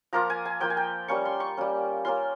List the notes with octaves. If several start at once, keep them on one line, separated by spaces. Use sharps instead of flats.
F3 A#3 F4 A#5
G#5
G#5
F3 A#3 F4 G5
G#5
G5
G3 A#3 C#4 C#6
C6
C#6
G3 A#3 C#4
A#3 C#4 F4 C6